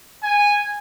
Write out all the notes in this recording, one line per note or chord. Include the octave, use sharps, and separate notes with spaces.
G#5